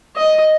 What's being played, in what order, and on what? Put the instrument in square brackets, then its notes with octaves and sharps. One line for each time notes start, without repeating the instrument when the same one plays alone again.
[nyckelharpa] D#5